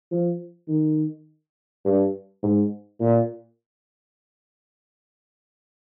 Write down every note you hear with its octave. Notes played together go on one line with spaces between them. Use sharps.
F3
D#3
G2
G#2
A#2